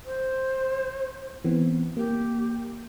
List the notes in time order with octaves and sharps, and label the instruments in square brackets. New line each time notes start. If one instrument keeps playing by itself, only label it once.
[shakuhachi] C5
[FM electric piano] E3 B3 C4
[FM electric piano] A#3 [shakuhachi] G4